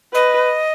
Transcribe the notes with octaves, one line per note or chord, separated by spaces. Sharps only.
B4 D#5